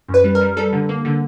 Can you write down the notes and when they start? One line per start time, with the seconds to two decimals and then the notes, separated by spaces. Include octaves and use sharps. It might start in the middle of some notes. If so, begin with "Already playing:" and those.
0.09 F#2
0.14 B4
0.24 G3
0.35 A#4
0.41 G3
0.57 G3 A4
0.73 D3
0.89 A#3
1.05 D3